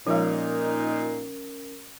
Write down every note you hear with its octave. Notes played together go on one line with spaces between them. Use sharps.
A#2 F3 G#3 C#4 D#4 A#4